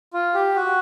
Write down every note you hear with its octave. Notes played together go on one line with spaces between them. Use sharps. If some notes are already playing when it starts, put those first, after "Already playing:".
F4
G4
F#4